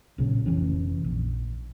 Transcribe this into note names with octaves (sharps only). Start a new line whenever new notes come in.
B1 A#2 C#3
F1 E3 C#4
A#1